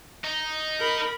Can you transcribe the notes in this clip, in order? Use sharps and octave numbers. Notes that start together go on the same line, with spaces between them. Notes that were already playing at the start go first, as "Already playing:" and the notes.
D#4
A#4 B5